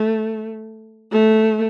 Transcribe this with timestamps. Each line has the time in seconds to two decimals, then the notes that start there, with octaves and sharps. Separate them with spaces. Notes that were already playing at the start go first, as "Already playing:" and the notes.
Already playing: A3
1.12 A3